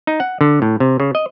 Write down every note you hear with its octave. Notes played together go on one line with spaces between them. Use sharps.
D#4
F#5
D3
A2
C3
C#3
D#5